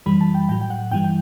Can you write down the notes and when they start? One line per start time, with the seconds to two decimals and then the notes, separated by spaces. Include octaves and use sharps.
0.06 F#2 E3 G3 B5
0.21 A5
0.34 G5
0.49 A2 F#3 G5
0.61 G5
0.70 F#5
0.91 G2 E3 G3 G5
1.04 G5